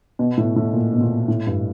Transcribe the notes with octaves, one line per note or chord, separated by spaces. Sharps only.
B2
A2
A2
A#2
B2
A#2
A2
G2